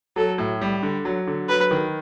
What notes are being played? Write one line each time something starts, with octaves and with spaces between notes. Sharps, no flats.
F#3 A4
A2
G3
D3
F#3
D3
F#3 B4
D#3